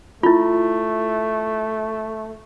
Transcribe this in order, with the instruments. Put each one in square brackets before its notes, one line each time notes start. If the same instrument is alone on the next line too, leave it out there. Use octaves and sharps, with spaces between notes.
[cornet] A3 [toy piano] E4 F4